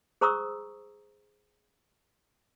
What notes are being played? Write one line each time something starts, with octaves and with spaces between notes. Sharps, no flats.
G#4 C5 A#5 C#6 D#6 E6